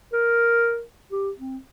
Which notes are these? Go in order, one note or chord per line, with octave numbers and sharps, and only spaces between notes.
A#4
G4
C4